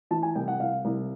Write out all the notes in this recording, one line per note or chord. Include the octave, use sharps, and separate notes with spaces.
E3 A5
G#5
C2 G5
F#5
C2 F5
C2